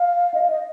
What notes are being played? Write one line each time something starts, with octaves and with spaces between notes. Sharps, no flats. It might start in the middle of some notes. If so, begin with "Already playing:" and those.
Already playing: F5
D#5
F5
D#5